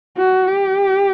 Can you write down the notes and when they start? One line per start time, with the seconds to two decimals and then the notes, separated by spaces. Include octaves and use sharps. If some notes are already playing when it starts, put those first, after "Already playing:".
0.17 F#4
0.48 G4